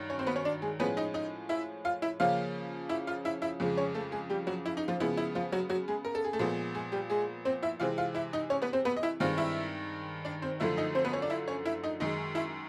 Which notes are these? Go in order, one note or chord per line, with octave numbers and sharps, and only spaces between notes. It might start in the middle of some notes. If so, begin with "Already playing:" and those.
Already playing: G2 D#3 F#3
C#4 C#5
C4 C5
B3 B4
C#4 C#5
D4 D5
G#3 G#4
A2 F3 G#3 B3 C#4 B4
D#4 D#5
D#4 D#5
E4 E5
F4 F5
E4 E5
C#3 F3 A#3 C#4 F4 F5
E4 E5
F4 F5
E4 E5
E4 E5
F2 C#3 F3 G#3
C#4 C#5
A3 A4
G#3 G#4
G3 G4
F#3 F#4
E4
D#4
F3 F4
C#3 F3 G#3 B3 E4
E4
F3 F4
F#3 F#4
F#3 F#4
G#3 G#4
A#4
A4
G#4
A3 A4
A#2 F3 G#3 B3
G#3 G#4
G3 G4
G#3 G#4
C4 C5
E4 E5
C3 E3 G#3 C4 F4 F5
F4 F5
E4 E5
D#4 D#5
C#4 C#5
B3 B4
C4 C5
B3 B4
D#5
E4 E5
G2 D#3 G#3 C4 F4 F5
E4 E5
D4 D5
C4 C5
F#2 D3 F3 A3 E4 E5
D#4 D#5
C4 C5
B3 B4
C#4 C#5
D4 D5
E4 E5
C#4 C#5
E4 E5
D#4 D#5
F#2 D#3 G#3 D#4 D#5
E4 E5